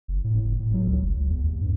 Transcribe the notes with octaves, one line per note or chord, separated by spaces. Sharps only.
F#1
A2
F#1
A2
F#3
C#2
F#1
C#2
E2
D#2
G2